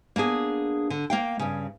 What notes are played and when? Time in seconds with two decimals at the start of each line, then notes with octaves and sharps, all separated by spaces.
0.16 A#3 B3 D4 G#4
0.90 D3
1.10 A#3 F5 G5
1.39 G2 C#3